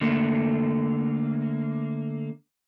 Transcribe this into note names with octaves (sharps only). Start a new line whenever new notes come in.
D3 A3 A#3